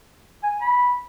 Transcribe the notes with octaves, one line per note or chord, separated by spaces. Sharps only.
G#5
B5